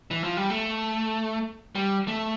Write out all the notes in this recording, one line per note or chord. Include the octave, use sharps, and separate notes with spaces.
E3
F3
G3
A3
G3
A3